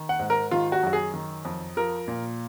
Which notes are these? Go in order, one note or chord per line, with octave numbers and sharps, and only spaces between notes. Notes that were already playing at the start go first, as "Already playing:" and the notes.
Already playing: D#3
F#5
G#2
A#4
D#3 F4
F#4
F#2 F#4
G#4
D#3
F2
F3 A#4
A#2